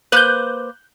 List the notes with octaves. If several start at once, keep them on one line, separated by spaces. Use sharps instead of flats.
A#3 B4 C5 F#6 G6